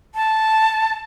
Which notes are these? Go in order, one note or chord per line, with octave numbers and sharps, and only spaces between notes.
A5